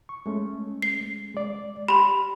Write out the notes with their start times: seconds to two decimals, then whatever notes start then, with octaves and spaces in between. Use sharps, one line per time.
0.09 C#6
0.26 G#3 A3 C#4
0.82 C7
1.34 G#3 D5
1.88 G4 B5 C6